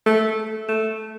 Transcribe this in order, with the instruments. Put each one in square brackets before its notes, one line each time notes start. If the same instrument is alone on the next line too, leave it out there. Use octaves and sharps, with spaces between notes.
[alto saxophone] A3
A3